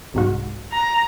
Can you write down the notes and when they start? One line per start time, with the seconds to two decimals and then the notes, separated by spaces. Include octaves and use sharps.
0.14 C2 G#2 F#4
0.72 A#5